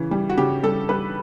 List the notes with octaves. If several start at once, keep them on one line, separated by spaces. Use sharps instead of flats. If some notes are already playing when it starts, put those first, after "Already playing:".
Already playing: C#3 E3
G3
F#4
C#3 G4
G3 A4
G3 B4